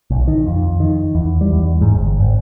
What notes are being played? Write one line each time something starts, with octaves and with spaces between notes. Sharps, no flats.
B1
D#3
F2
D#3
E2
G3
E2
G#2
G1
G#1